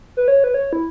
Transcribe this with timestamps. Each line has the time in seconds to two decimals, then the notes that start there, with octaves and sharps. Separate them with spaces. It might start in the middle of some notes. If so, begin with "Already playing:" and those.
0.17 B4
0.28 C#5
0.44 B4
0.54 C#5
0.73 E4